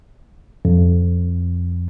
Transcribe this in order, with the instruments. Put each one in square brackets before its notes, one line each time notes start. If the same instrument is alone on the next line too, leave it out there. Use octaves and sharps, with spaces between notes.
[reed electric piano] F2